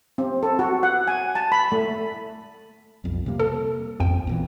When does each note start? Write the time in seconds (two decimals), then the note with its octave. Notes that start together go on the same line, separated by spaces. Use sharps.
0.18 C4
0.43 A4
0.59 F#4
0.83 F#5
1.07 G#5
1.35 A5
1.52 B5
1.72 A3
3.04 B1 F2
3.26 C3 G3 A#3
3.40 A4
4.00 A1 F2 G5
4.27 E2 A#2 E3